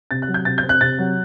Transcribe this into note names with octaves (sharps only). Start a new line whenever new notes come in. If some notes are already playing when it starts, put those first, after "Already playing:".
C3 A6
F#6
F#3
G6
C3 A6
G6
C4
F#6
C3 A6
F#3